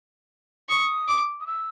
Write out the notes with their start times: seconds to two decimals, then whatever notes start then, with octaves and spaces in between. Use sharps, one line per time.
0.69 C#6 D#6
1.08 D6
1.40 D#6
1.47 E6